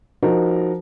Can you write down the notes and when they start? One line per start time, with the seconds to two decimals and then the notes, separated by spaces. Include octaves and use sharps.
0.23 F3 D#4 F#4 A#4